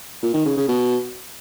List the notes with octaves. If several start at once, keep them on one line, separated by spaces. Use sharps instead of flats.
A#2
D#3
C#3
C#3
B2